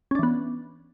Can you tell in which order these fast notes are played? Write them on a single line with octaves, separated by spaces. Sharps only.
C#4 D4 E3 B3